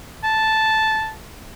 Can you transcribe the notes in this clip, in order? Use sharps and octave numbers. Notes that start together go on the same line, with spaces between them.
A5